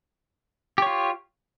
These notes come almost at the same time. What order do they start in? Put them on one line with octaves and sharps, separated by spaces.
G4 C#5 F4